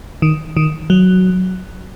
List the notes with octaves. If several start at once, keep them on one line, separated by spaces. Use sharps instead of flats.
D#3
D#3
F#3